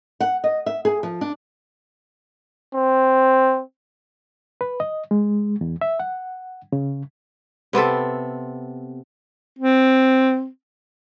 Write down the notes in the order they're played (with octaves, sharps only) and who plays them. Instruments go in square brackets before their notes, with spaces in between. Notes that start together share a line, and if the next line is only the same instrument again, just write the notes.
[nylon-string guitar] F#5
D#5
E5
G#4
F3
D4
[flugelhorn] C4
[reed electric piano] B4
D#5
G#3
E2
E5
F#5
C#3
[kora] C3 B3 C4 A4
[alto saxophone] C4